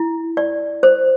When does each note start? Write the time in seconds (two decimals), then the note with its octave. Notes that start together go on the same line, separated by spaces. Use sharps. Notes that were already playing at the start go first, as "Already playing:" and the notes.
Already playing: E4
0.37 D5
0.83 C5